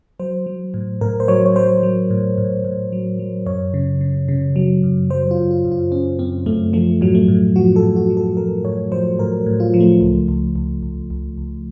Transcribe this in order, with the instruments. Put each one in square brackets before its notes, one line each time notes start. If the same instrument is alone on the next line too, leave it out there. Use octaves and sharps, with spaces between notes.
[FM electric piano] F#3 C5
F#3
A2
A2 A#4
C5
F#3 C#5
C#5
F#3 C5
F#3
A2
A2
A2
F#3
F#3
F#2 C#5
C#3
C#3
C#3
F#3
F#2
F#3 C5
F4
F#2
F4
F#2
F4
F#2 C#4
F#2 C4
F#2 A3
F3 A3
A2 F#3
A3
A2
F3 F#4
A4
A2
F#4
F3
A4
F3 A#4
A2 C#5
F3 C5
A2 A#4
A2
F4
F3
A3
C#2
C#2
C#2
C#2
C#2
C#2